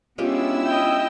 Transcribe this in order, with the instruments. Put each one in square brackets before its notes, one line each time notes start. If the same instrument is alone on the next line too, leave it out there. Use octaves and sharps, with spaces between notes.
[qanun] G#3 F4 G4 [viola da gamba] B3 C#4 D4 [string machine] E4 E6
[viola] D#5 G5